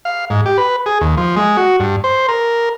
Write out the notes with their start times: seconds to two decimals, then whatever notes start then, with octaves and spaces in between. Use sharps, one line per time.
0.05 F5
0.30 G#2
0.46 G4
0.58 B4
0.86 G#4
1.01 D#2
1.17 F3
1.36 G#3
1.57 F#4
1.80 G2
2.04 C5
2.29 A#4